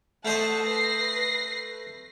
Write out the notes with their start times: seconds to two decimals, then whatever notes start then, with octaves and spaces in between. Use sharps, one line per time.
0.25 A3 C5 D#5 F#5 A5
0.64 B4 A#6 C7